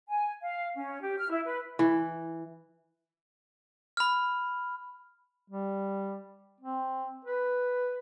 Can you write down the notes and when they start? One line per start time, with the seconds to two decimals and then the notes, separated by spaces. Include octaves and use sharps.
0.08 G#5
0.42 F5
0.75 C#4
1.01 G4
1.18 F6
1.31 E4
1.46 B4
1.79 E3
3.97 B5 F6
5.50 G3
6.60 C4
7.25 B4